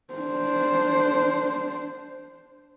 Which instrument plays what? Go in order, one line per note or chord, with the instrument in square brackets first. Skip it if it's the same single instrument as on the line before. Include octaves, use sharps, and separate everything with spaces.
[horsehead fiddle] D4 C5